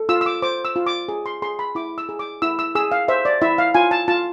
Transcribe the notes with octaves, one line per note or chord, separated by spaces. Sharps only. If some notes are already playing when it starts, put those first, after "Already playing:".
Already playing: A4
F4 E6
E6
D6
C5 D6
E6
F4
D6
G#4
C6
G#4 C6
B5
E4 D6
E6
G#4
D6
E4 E6
E6
G#4 E6
F5
C5 E5
D5
E4 E5
F5
F4 G#5
A5
F4 A5